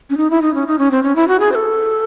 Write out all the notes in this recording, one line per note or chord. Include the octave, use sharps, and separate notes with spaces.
C#4
D#4
E4
D#4
C#4
D#4
C#4
C4
C#4
E4
F#4
G#4
C5
A4